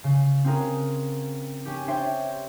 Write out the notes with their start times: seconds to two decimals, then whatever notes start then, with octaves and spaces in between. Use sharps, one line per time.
0.04 C#3
0.44 C4 C#4 F#4 G#4 A#4
1.65 C#4 G4
1.88 D4 C5 C#5 E5 G5